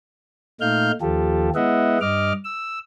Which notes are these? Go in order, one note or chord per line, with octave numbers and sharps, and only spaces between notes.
A#2 A3 D#4 F5 F6 G6
D#2 F3 F4 G4 A4
G#3 B3 E4 D#5 E5 F#5
G2 D#5 D6 F6
E6